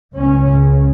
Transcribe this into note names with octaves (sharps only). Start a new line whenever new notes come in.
C#2 C#3 C#4